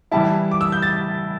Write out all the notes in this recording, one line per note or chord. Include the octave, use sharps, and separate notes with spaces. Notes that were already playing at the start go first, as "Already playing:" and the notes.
E3 G3 E4 A5
D6
E6
G6
A6